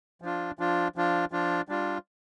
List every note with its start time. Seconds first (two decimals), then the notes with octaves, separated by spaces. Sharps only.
0.22 F3 D4 F4
0.59 F3 D4 F4
0.96 F3 D4 F4
1.31 F3 D4 F4
1.68 G3 D4 F4